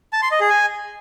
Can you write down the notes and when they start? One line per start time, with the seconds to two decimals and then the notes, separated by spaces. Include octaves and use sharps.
0.13 A5
0.22 C6
0.31 D#5
0.41 G#4
0.50 G#5